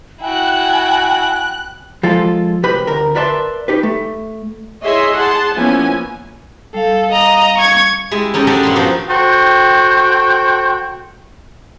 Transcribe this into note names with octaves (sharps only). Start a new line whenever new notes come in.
E4 F#4 G5 G#5 F#6
F3 G#3 F4 G#4 A4
C2 G4 B4 C5 B5
D2 A#4
A#4 B4 D5 E5 A5 C6
D#4 G4 B4
A3
E4 G#4 C#5 D#5 E5 C6
G#4 F#5 A5 C6
F3 A#3 B3 C#4 E4 G#5
G3 A4 F5
D#5 A#5
C#6 G#6
G3 G#3 E4
C#4 D#4 G4 A4
G3 D4 A4 D#5 E5 F#5
G2 A#2 C#5 B5 C6
F3 B3 D#4 F#4 G4
F#4 A4 C5 G5